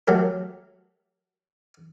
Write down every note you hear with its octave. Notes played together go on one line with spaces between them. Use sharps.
F#3 A3 G4 A#4